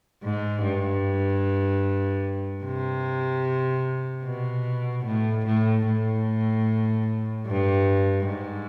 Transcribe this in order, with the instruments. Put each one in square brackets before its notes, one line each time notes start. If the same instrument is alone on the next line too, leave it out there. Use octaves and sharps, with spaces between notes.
[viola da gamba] G#2
G2
C3
B2
A2
A2
A2
G2
G#2